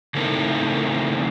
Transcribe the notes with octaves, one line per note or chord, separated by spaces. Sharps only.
C#3 E3 A3 C4 D#4 A#4